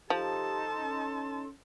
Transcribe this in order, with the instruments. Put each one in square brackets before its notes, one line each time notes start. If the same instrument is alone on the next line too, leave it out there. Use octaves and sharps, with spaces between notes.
[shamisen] F3 [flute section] D#4 A4 C6 [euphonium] G4 [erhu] A5
[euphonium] C#4